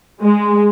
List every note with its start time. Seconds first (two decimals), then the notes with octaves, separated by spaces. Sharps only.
0.22 G#3